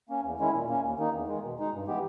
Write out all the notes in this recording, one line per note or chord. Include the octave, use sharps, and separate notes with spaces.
A#3 C#4
E2
D#3 G#3 C#4 E4
A#2
A#3 C#4
D#2
D#3 A#3 D#4
E2
D#3 G#3
B2
G#3 D#4
G2
E3 G#3 B3 G4